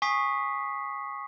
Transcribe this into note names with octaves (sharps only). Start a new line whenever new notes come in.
G#5 C#6 D#6 B6 C7